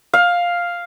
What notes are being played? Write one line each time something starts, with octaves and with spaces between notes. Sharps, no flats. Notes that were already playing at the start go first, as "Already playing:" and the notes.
F5